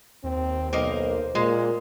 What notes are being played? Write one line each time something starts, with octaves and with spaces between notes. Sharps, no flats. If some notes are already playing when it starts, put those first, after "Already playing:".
D#2 C4
B1 A#3 A#4 C5 D#5
A#2 G#3 A#3